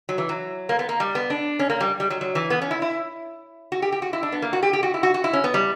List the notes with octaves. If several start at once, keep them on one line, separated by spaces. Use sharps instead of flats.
F#3
E3
F#3
A#3
B3
A#3
G3
B3
D4
C#4
A#3
G3
G3
F#3
F#3
E3
B3
C#4
E4
E4
F#4
G4
G4
F#4
E4
D4
B3
A#3
F#4
G4
G4
F#4
E4
F#4
F#4
E4
C#4
B3
G3